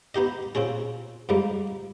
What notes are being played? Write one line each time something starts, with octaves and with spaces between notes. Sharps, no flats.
B3 D#4 G4 D#5
A#2 C4 C#4 G#4
F2 G#2 G3 A#3